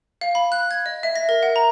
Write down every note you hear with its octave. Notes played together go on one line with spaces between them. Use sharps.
F5
B5
F#6
G#6
D#5
E5
A#6
A#4
F#5
A#5